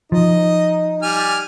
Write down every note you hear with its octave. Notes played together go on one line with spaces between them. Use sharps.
F3 D#4 D#5
G3 G#5 F6